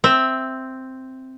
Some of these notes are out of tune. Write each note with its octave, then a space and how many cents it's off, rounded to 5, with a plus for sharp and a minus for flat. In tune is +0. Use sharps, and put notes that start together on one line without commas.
C4 +0 E5 +0